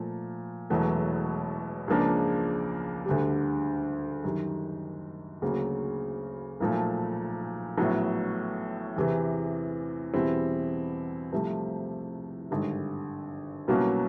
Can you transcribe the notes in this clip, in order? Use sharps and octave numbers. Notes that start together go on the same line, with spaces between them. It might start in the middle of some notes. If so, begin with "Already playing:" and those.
Already playing: A#2 F3 A3
E1 E2 B2 F#3 A3
C#2 C#3 F3 A#3 D4
D2 D3 G3
F#2 D#3 G3
D2 C#3 F#3 A#3
B1 A#2 F3 A3
A#1 A2 F#3 B3
E2 C3 E3
E2 B2 G3 C4 E4
C2 C3 F3 A3
G#1 G2 D3
C2 B2 F#3 A#3 C#4